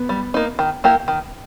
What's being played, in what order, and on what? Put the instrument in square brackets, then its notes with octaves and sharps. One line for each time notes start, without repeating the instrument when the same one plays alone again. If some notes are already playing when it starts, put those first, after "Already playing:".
Already playing: [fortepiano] B3
[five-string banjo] G3
A#3 D#4
D#3
A#3 E4 G4 A#4
D#3